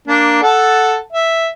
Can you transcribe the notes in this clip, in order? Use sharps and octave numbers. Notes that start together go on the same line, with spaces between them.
A#3 D4
A4 F#5 A5
E5